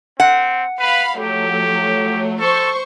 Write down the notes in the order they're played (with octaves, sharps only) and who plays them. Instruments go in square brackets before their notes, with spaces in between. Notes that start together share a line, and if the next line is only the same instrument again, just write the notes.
[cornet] C4 [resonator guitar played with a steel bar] F#5
[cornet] B4 [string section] F5 B5
[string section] F3 F#3 A3 [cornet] G4
[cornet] A4 [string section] C5 C#6